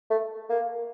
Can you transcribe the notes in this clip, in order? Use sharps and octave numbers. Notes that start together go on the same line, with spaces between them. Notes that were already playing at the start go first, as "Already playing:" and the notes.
A3
A#3